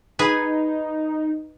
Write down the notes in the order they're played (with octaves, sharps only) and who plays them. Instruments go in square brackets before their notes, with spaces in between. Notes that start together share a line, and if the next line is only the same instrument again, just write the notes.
[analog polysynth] D#4 [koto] G#4 B4 G#5